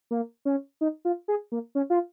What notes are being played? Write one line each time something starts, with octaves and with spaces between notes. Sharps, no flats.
A#3
C#4
D#4
F4
G#4
A#3
C#4
F4